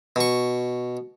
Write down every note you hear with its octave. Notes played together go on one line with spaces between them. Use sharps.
B2 C#6